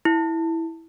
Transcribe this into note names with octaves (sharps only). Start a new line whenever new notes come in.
E4